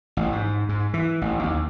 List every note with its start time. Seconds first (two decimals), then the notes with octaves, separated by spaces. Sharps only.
0.17 A1
0.32 G#2
0.69 G#2
0.94 E3
1.21 A1
1.44 D#2